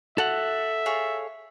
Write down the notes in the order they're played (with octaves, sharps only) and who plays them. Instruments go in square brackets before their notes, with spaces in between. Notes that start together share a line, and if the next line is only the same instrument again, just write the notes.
[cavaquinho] F#4 [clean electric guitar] A4 F#5 [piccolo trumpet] E5
[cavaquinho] G#4 C#5 F5